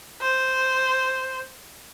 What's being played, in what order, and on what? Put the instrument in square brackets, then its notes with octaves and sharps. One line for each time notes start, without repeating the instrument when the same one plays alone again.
[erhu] C5